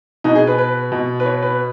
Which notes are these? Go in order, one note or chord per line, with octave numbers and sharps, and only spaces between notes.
B2 D#4
G#4
B4
B4
B2
B4
C#5
B4